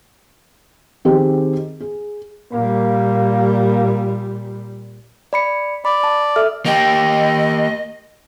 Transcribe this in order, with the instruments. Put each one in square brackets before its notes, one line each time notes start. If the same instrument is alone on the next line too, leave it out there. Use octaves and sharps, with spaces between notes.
[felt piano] D#3 C4 G4 G#4
G#4
[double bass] A#2 G3 [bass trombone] A#3
[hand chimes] D5 B5 C#7
[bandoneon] D5 [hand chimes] B5
[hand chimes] A5
A4 E5 F6
[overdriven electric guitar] A#3 G4 [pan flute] D#5